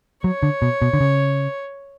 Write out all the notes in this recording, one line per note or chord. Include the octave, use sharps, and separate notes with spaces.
F#3 C#5
D3
B2
B2
D3
C#3